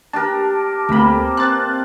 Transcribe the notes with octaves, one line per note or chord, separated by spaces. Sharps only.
D4 G4 A#4 A5
D2 C3 A3 A#3 B5
C4 F#6 A6